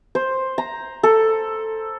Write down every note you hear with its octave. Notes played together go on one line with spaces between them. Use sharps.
C5
A#5
A4